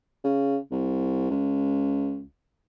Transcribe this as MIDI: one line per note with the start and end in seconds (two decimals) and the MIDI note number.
0.24 0.57 49
0.71 1.30 36
1.30 2.23 37